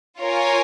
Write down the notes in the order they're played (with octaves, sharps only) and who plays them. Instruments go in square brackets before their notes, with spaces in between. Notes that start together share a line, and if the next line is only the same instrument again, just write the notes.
[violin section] F4 A#4 C#5 G#5